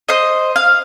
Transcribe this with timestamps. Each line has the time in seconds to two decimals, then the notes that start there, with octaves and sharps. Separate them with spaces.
0.09 C5 D#5
0.56 F5